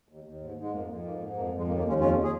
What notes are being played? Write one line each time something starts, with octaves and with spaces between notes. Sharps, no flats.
D#2
D#2
G#2
G#2 G#3
F2 A#3
F2
G#2 A#3
G#2
F2 A#3
F2
G#3
D#2 A#3
A#3
D#2
G#3 C#4
F2 C#4 F4
G#4